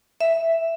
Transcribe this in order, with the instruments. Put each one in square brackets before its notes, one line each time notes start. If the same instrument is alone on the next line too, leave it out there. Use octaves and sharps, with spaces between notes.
[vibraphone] E5